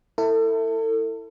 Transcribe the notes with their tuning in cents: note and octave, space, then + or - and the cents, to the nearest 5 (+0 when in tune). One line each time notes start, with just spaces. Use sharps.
E4 -5 A4 +35